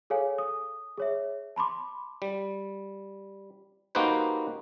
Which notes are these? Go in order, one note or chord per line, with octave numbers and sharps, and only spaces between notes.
G#4 A4 C#5 F5 G#5
D#6
G#4 C#5 E5
A5 B5 C6 D6
G3
A#3 D#4 F#4 G4 B4 C5